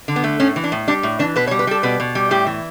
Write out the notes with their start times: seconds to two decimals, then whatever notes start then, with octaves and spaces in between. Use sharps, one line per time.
0.08 D3
0.16 B3
0.24 A3
0.40 A2 C#4
0.56 E3
0.64 D4
0.72 A2
0.88 G3 D4
1.03 A2
1.19 E3 D4
1.36 B2 B4
1.47 C#5
1.51 G3
1.59 B4
1.67 G3 A4
1.83 B2 B4
2.00 B2
2.15 G3
2.31 A2 G4
2.47 E3